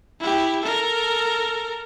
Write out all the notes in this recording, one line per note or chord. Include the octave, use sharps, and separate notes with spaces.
E4 G4
A4 A#4